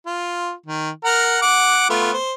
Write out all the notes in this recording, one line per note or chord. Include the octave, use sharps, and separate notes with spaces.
F4
D#3
A#4 F#5 A#5
F#5 D6
A3 B3 F4
C5